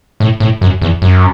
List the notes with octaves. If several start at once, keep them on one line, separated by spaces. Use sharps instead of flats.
A2
A2
F#2
E2
F#2